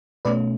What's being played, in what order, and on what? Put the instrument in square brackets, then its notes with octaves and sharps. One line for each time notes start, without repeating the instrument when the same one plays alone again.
[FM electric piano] B2 A3 C#4 B4 D5